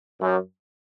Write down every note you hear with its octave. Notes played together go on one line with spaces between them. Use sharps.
F#2